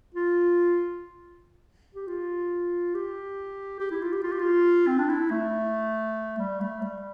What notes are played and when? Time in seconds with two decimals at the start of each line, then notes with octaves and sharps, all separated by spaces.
0.14 F4
1.95 G4
2.08 F4
2.95 G4
3.80 G4
3.91 E4
4.02 F4
4.12 G4
4.23 F4
4.32 G4
4.39 F4
4.87 C4
4.98 D4
5.10 E4
5.31 A3
6.39 G3
6.61 A3
6.82 G3